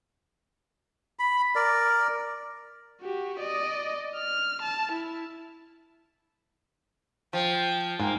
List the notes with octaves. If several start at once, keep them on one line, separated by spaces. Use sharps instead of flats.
B5
A#4 D5
F#4 G4
D5 D#5
F6
A5
E4
F3 G5
G#2 A#3 G5